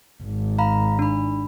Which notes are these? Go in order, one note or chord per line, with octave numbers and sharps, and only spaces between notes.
G#1
F5 A#5 B5
D4 B5